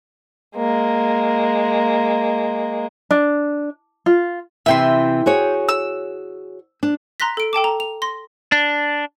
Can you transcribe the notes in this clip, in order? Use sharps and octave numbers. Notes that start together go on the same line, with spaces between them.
G#3 A#3
D4
F4
C3 E3 E5 G5 C6
F#4 G#4 C#5
E6
D4
A#5 C6 F#6 A#6 B6
A4 D7
A4 G5 A5 D6
A#5
F7
C6 A#6
D4